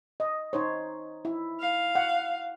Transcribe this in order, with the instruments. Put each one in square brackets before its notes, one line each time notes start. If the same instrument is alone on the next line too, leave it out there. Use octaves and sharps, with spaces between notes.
[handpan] D#5
D#4 C5 C#5
E4
[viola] F5
[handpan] F#5